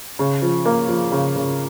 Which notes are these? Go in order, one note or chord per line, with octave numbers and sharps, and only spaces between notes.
C#3
F3
A#3
F3
C#3
C#3